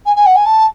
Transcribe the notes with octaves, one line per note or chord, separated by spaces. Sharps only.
G#5
G#5
F#5
G#5
A5